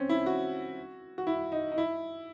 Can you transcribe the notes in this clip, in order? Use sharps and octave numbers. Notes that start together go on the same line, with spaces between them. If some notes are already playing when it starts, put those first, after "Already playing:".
Already playing: C4 C#4
E4
F#4
F#4
E4
D#4
D#4
E4